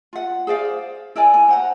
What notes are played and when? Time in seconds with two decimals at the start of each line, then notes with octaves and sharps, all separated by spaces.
0.13 F4 F#5
0.47 G#4 C5 D5 F5
1.16 E4 A#4 D5 G#5
1.34 G#5
1.49 C5 F#5 A#5